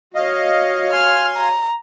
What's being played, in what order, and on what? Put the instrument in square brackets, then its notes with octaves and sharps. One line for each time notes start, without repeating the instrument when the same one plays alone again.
[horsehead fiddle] F#4 C#5 [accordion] D#5 F5
[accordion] F5 G#5 C6 [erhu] F6
[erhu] A#5